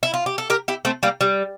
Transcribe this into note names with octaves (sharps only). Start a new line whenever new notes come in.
E4
F4
G4
A4
G4 A#4
E4 G4
A3 C4
G3 A#3
G3